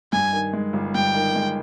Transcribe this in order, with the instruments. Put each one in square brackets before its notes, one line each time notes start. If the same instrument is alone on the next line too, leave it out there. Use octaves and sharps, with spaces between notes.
[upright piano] G2 [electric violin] G#5
[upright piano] D#3
G#3
G1
[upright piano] G2 [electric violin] G5
[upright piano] D#3
G#3